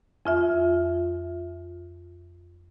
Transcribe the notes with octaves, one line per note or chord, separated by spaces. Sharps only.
F2 F4 E5